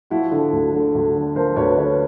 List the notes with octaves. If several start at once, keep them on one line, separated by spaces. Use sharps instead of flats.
F3 E4 F#4
D3
D2
D3
D2
D3
F3 A#4 C5
D2 B4 C#5
D3 B4 C#5